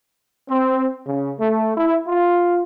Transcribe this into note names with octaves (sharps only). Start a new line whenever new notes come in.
C4
C#3
A3
E4
F4